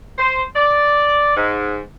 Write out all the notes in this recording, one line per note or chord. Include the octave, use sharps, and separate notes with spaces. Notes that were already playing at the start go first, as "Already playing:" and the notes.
C5
D5
G#2